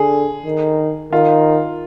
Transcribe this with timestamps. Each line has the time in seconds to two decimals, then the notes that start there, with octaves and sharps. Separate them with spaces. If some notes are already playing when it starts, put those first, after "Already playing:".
Already playing: D3 G#4
0.45 D#3
1.13 D#3 F4